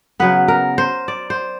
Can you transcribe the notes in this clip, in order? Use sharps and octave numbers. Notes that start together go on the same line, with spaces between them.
C#3 F#3 B3 B4
A#4
C5
D5
C5